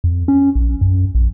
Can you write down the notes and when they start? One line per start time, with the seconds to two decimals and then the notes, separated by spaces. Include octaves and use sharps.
0.04 F2
0.28 C#4
0.55 A#1
0.81 F#2
1.15 A#1